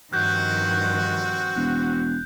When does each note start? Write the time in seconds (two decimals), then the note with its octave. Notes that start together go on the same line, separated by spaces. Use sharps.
0.13 G2 D#3 F3 C4 F#4 F#6 G6
1.56 E1